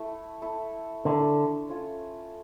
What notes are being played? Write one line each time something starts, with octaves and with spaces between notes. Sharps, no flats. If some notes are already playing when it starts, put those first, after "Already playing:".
Already playing: A3 E4 A4
A3 E4 A4
D3 A3 E4 A4
C#4 F4 A4 C#5